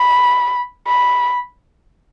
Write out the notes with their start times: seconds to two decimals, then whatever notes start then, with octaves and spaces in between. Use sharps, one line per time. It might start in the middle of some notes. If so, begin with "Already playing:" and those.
Already playing: B5
0.87 B5